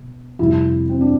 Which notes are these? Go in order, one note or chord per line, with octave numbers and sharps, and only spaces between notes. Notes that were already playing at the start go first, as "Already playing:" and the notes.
Already playing: B2
F2 C3 G3 E4
C4
D4